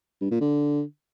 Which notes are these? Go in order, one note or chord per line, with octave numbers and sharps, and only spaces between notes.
G2
A#2
D3